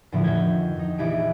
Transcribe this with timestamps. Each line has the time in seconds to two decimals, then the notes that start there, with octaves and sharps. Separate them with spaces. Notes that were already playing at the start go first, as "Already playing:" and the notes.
0.12 E2 A2 D3 F3 E4
0.24 F2 D#3 F#4 G5 G#6
0.76 F2 D#4
0.98 A#1 E3 E4 G4 G#5 D7